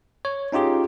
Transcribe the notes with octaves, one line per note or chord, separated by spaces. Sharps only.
C#5
C#4 D#4 F4 G4 G#4